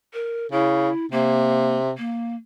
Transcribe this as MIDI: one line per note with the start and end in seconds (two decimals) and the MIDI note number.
0.14 0.47 70
0.52 0.89 49
0.52 1.06 64
1.12 1.92 48
1.12 1.78 58
1.98 2.35 58